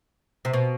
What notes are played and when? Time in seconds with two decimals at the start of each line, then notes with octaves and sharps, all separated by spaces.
0.45 C3
0.53 B2